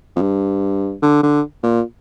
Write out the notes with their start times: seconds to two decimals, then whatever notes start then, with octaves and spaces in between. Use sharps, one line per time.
0.16 F2
0.21 G2
1.02 D3
1.23 D3
1.63 A#2